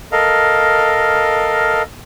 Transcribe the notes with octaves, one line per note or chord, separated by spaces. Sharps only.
A4 A#4 D#5 F5